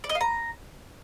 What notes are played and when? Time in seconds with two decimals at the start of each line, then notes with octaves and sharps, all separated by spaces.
0.04 D5
0.09 D#5
0.15 F5
0.21 A#5